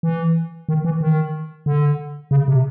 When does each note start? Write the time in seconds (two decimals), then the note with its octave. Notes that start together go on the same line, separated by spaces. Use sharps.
0.03 E3
0.69 D#3
0.85 E3
1.01 D#3
1.66 D3
2.31 C#3
2.48 C3